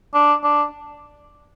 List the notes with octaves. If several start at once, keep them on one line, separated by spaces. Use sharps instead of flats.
D4
D4